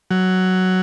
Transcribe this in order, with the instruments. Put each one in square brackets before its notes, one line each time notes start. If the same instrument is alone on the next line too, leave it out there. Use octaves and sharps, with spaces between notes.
[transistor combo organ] F#3